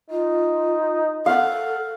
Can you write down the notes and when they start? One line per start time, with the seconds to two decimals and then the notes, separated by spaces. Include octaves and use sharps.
0.10 D#4 F4
1.26 A4 F5 F#5